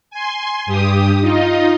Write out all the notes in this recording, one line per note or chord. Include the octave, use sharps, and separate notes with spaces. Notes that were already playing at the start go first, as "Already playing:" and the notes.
G#5 C6
G2 G4 D#6
D#4 F4 D#5